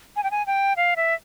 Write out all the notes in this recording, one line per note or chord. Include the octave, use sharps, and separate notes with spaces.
G#5
G5
G#5
G5
F5
E5